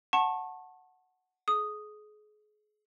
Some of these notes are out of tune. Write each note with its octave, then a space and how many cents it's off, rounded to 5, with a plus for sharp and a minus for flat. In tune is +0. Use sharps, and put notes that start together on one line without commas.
F#5 +0 A5 +5 C#6 -30
G#4 +35 D#6 +0